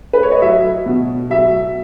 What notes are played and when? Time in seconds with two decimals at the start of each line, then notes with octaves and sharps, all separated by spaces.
0.13 B4
0.23 C#5
0.32 D#5
0.42 F#3 E5
0.86 B2
1.30 F#3 E5